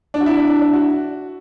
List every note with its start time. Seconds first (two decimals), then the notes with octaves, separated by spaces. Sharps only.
0.14 D4
0.21 F#4
0.26 E4
0.38 D4
0.49 D4
0.61 D4
0.73 F#4